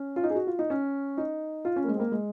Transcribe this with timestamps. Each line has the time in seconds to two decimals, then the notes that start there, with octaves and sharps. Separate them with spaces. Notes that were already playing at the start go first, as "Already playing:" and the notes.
Already playing: C#4
0.16 F4
0.24 D#4
0.30 G#4
0.35 F#4
0.47 F4
0.59 D#4
0.70 C#4
1.18 D#4
1.65 F4
1.76 C#4
1.84 A#3
1.88 G#3
1.95 C4
1.99 A#3
2.12 G#3